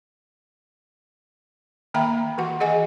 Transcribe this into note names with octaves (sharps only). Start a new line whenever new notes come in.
D#3 A#3 E5 G5 A#5 B5
E3 F#4 F#5
G#4 D#5 F#5 G#5